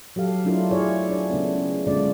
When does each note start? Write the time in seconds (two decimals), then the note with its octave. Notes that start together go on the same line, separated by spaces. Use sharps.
0.16 F#3 G4 A4 F5
0.44 F#3 A3 D4 E4 F4 A#4
0.71 E4 G#4 C#5 D5
1.09 D4 C#5
1.30 C#3 A3 B3 D4
1.87 D3 G#3 A3 C#4 F4 D5